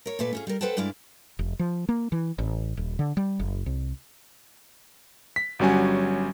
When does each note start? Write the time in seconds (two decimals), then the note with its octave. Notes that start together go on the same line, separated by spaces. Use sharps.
0.06 A#4 C#5
0.19 A#2 A3 B4 D5
0.33 C#4 F4 G#4
0.47 G3 A#4
0.61 A4 B4 C5 F#5 G5 A5
0.77 G2 G#3 E4 D5 F5
1.39 F1
1.59 F3
1.89 A#3
2.12 E3
2.38 A1
2.77 D#1
2.99 D3
3.17 G3
3.40 F#1
3.66 C2
5.36 B6
5.59 G1 F#3 G3 C#4 F#4 G#5